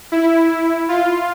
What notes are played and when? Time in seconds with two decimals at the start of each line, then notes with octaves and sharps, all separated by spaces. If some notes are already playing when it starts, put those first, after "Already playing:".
0.12 E4
0.89 F4